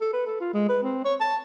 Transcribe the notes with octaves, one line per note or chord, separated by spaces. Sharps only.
A4
B4
A4
F4
G#3
B4
C4
C#5
A5